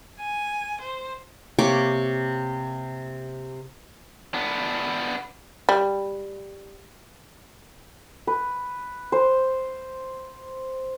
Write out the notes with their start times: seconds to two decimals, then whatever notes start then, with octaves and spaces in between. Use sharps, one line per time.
0.20 G#5
0.81 C5
1.59 C3 A#3 C#5 D6
4.34 B3 D4
5.69 G3
8.27 B4
9.12 C5